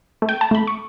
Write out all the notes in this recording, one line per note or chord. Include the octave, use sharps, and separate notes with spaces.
A3
G5
A5
A3 B5
C#6